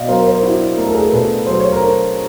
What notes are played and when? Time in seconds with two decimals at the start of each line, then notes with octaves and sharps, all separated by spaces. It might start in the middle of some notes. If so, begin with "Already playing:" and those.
Already playing: B2 D5 D#5 F5
0.08 F#3 A#4 C5
0.25 A#4 C5
0.42 D4 E4 F#4
0.77 A3 A#4
0.85 A4
0.92 G#4 A#4
1.11 B2 A4 B4
1.46 F#3 C5
1.60 C#5
1.72 A#4 C5
1.82 D4